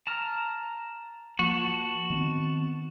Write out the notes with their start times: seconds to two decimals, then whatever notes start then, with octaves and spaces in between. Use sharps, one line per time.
0.07 A5 A#5 F6
1.39 F3 A#3 F#4 A5
2.10 D#3 B3 C4